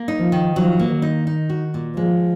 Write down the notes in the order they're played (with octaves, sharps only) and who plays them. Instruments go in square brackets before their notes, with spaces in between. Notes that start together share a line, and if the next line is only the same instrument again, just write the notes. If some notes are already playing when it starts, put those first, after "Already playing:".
Already playing: [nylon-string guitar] A#3
D#4
[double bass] F3
[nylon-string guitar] D#3
[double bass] F3 [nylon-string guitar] F#3
[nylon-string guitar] A#3
[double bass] D#3
[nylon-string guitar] D#4
D#4
F#4
A#2
[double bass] F3 [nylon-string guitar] G#3